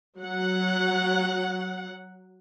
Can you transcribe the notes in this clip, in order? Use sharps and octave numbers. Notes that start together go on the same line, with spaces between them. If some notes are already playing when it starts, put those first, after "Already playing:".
F#3 F#5